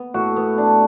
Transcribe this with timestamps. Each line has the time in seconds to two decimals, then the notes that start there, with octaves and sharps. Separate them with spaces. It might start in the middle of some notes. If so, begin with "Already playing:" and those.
Already playing: B3
0.14 A2 F#4
0.36 B3
0.58 D4